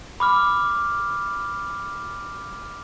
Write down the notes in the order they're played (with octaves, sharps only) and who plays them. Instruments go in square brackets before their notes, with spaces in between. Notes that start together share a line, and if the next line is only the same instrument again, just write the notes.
[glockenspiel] B5 D6 F6